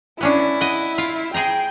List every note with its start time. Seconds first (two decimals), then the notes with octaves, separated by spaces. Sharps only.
0.21 B3 C#4 D4 E4
0.61 D#5 F#5
0.98 F4
1.34 G#4 C5 G5 A#5